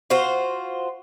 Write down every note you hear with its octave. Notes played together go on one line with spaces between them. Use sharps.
F4 F#4 C5